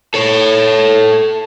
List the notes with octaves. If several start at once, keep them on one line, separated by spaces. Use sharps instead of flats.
A4 C#5